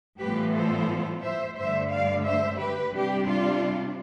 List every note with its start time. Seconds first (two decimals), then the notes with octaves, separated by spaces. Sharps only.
0.20 A2 E3 G3 B3 F4 G4 B4
0.55 A4 C5
1.23 C5 E5
1.57 G2 D3 A3 C5 E5
1.92 D5 F5
2.25 C5 E5
2.59 G4 B4
2.94 C3 G3 D4 G4
3.27 F4